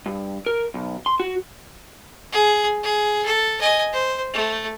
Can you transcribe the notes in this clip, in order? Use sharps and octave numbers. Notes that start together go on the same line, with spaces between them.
G2
A#4
B1
C6
F#4
G#4
G#4
A4
D#5 G#5
C5
A3